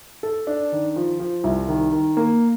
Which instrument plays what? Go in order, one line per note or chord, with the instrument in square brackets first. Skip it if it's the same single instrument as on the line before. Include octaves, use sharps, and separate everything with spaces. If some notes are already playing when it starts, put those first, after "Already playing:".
[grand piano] A4
D4
D#3
F3
F3
C2
D#3
D#3
A#3